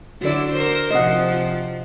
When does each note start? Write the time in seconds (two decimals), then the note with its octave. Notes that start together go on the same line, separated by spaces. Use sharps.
0.21 D3 F#3 E4 F#4 D5
0.53 A#4 C5
0.91 C3 F3 D#5 F#5